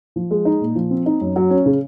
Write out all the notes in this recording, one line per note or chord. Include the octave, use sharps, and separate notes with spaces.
F3
G#3
D#4
A#2
F3
C4
D#4
F#2
F#3
C#4
C#3